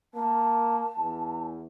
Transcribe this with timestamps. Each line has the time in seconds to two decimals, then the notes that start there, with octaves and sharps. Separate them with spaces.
0.14 A#3 A5
0.98 E2